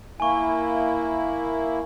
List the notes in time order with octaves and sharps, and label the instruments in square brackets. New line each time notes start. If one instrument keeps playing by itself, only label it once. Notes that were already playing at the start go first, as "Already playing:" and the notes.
[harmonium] A#3 E4 [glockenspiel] G#5 C#6